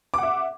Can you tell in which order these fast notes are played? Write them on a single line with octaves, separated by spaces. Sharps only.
D6 F#5 E5